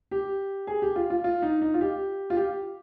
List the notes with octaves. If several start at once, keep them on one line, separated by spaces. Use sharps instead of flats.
G4
G#4
G4
F4
F4
F4
D#4
D#4
F4
G4
F4
G4